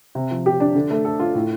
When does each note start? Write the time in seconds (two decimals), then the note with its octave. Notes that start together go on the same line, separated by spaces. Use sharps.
0.15 C3
0.31 F3
0.46 G4
0.60 D4
0.75 D3
0.90 A3
1.05 A4
1.20 F4
1.35 A2